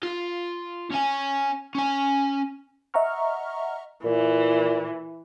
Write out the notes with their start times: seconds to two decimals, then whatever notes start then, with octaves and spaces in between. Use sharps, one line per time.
0.03 F4
0.92 C#4 G#5
1.75 C#4 G#5
2.94 D#5 E5 F#5 A#5 C#6 F6
4.04 A#2 E3